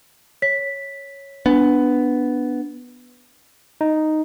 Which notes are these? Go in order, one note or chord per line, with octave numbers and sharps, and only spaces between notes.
C#5 B6
B3 D4
D#4